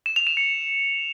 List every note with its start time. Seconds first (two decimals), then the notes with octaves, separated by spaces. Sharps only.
0.06 E7
0.16 F7
0.27 E7
0.37 C#7